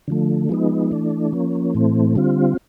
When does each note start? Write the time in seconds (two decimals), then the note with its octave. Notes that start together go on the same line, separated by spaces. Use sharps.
0.08 D3 F3 A3
0.49 F3 G#3 B3 D#4
0.91 E3 A3 D4
1.33 F3 A#3 C#4
1.75 A2 E3 A3 C4
2.15 D3 G3 C4 F4